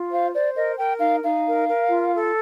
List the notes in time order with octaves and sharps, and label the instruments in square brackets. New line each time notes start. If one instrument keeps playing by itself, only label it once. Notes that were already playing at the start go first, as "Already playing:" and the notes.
Already playing: [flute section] F4
C5 F5
C5 D5
A#4 D#5
A#4 G5
D#4 F5
D#4 F5
A#4
A#4
F4
A4